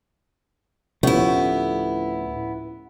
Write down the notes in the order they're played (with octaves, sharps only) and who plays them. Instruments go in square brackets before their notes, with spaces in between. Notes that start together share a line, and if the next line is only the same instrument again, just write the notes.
[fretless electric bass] D2 F3 A3 [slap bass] A2 [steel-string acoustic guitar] B3 E4 [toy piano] C#4 G4